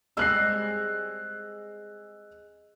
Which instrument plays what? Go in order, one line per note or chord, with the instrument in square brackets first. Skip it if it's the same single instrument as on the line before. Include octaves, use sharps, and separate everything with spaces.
[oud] G3 G#3 C4 [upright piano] E6 F#6 C7